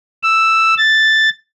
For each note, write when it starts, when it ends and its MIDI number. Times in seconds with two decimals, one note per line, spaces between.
0.23 0.74 88
0.78 1.29 93